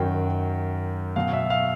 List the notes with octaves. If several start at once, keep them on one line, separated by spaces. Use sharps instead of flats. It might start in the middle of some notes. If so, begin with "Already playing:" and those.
Already playing: F#2 D#3 F#3 G5
B2 F#3 F5
E5
F5